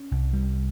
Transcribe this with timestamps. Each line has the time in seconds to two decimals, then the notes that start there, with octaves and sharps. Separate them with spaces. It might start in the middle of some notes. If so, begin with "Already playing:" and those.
Already playing: C#4
0.11 C2
0.33 G3